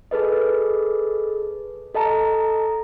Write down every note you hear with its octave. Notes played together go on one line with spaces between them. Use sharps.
G#4 A4 B4 D#5
A4 D#5 A5 A#5